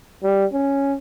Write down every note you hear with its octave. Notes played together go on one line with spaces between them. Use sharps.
G3
C#4